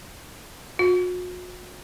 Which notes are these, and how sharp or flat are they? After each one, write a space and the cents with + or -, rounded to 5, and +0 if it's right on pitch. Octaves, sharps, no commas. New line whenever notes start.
F#4 -45